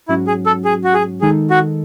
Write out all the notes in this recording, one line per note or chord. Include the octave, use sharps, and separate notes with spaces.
G#2 F#3 C#4 E4 F#4
G#4
A4
G#4
F#4
G#4
D#3 G#3 D#4 G#4 A4
F#4